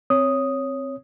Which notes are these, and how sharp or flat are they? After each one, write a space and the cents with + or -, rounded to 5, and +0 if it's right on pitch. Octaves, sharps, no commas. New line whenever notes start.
C4 +0 C#5 +0 D#6 +0